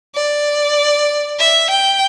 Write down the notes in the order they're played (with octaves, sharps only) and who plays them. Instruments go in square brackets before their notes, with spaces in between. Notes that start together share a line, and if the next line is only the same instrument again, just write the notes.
[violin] D5
E5
G5